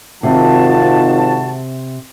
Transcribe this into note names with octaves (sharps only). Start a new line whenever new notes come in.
G#1 C3 D#3 F4 F#4 A5